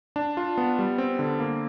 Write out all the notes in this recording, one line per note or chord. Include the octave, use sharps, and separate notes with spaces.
D4
F4
B3
G3
C4
D3
A#3